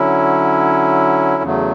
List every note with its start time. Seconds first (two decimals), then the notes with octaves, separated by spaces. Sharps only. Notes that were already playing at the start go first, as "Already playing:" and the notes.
Already playing: D3 F#3 C#4 E4
1.43 E2 C#3 F#3 A3